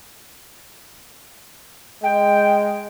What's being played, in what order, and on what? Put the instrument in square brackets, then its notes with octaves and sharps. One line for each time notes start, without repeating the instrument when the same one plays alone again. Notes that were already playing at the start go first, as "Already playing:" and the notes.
[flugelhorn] G#3 [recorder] G5